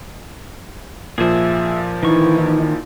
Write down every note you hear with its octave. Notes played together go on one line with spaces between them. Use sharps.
A#2 F3 G#4 E5
D#3 E3 D#4 E4 C#6